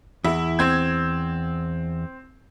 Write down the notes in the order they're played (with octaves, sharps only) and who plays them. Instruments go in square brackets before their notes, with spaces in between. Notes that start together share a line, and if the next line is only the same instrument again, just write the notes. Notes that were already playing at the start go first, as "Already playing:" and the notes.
[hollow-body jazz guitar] E2 [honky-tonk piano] E4
[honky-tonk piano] C4 G#6